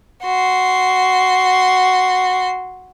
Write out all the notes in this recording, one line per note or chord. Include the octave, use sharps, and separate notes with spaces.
F#4 C6